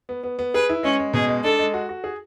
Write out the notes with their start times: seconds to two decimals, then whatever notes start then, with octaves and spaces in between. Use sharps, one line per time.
0.09 B3
0.23 B3
0.39 B3
0.54 G#4 B4
0.69 E4
0.83 G#3 C#4
0.99 G#3
1.13 B2 G#4
1.28 G#3
1.44 D4 A4
1.59 G#3
1.74 F#4
1.89 F#4
2.04 G#4